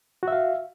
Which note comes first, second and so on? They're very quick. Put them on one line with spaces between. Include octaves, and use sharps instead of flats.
F#4 E5 F5